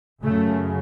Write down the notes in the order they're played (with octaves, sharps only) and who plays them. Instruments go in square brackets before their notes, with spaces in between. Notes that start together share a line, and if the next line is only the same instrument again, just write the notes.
[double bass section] F#2 C#3 A3